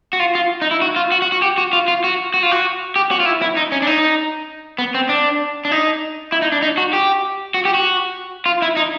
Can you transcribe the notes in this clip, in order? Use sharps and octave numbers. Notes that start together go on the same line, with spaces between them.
F#4
F4
F4
D#4
E4
F#4
F4
F#4
F#4
F#4
G4
F#4
F4
F4
F#4
F#4
F4
F#4
G4
F#4
F4
E4
E4
D#4
C#4
D4
D#4
B3
C4
D4
D4
D#4
E4
D#4
D4
D#4
F#4
G4
F#4
G4
F#4
F4
E4
D#4